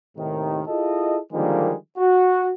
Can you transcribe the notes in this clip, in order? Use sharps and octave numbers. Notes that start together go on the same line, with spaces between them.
D#2 A2 C3 D#3
E4 F4 G#4 A4 D#5
D3 D#3 F3 G3 G#3 A#3
F#4